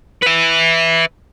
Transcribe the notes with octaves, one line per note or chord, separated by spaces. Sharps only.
B4 E5